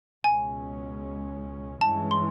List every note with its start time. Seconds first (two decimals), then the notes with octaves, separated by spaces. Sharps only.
0.24 C#2 B2 G#3 C#4 G#5
1.81 G2 E3 G#3 C#4 A5
2.11 C6